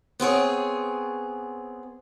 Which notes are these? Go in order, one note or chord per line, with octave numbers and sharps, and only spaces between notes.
B3 C4 G#4 C#5